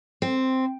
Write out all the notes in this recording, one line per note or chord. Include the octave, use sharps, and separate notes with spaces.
C4